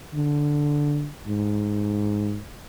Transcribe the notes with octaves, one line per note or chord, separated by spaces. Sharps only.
D3
G#2